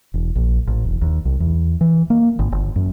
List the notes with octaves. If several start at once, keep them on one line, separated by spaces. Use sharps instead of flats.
E1
A#1
A1
E1
D#2
C2
E2
E3
A#3
G#1
G1
F#2